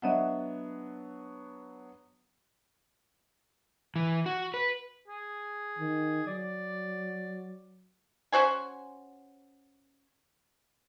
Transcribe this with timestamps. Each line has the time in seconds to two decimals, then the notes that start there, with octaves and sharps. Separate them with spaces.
0.02 F#3 B3 D4 D#5 E5 F#5
3.96 E3
4.26 F#4
4.54 B4
5.08 G#4
5.79 D#3
6.27 F#3 D5
8.32 C#4 F#4 C5 G#5